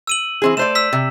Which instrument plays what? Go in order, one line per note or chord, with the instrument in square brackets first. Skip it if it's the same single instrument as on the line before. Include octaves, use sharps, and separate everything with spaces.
[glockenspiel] E6 D#7 F#7
[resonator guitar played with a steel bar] E3 C4 G#4
[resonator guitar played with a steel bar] A3 C5 D5 [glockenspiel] E7
[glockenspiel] E6 B6
[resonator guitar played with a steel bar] C3